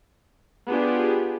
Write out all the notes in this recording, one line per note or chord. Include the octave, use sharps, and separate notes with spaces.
B3 D4 F4 G4 G#4